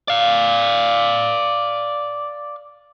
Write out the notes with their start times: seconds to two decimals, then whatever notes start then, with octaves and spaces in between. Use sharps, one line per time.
0.08 D5 F5